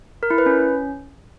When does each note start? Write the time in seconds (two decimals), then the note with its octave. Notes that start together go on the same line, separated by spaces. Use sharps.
0.23 A#4
0.30 E4
0.38 B4
0.46 C#4